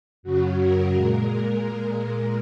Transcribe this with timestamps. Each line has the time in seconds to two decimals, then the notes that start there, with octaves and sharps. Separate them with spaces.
0.23 F#2 C#3 F#3 F#4
0.59 A#4
0.94 A#2 G#3
1.64 A#2 G#3